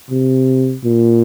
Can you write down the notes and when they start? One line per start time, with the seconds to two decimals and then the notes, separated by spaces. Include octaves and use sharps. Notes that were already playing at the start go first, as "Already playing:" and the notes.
0.10 C3
0.84 A#2